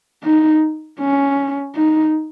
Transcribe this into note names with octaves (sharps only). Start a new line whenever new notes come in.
D#4
C#4
D#4